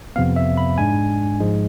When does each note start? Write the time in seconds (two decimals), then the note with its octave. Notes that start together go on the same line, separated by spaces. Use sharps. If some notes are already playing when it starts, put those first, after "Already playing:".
0.16 F2 C3 F3 B3 F5
0.36 E5
0.57 B5
0.78 G#2 G#3 D4 G#5
1.40 G#2 F3 G#3